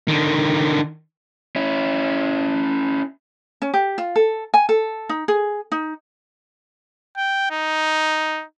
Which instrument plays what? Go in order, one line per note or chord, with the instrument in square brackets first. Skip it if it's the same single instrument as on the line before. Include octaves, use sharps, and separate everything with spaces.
[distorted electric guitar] D3 D#3
[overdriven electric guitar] C#4 E4
[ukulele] C#4
G4
F4
A4
G#5
A4
D#4
G#4
D#4
[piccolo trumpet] G5
D#4